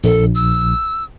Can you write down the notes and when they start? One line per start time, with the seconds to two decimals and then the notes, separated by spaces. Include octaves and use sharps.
0.04 A#1 A4
0.35 E6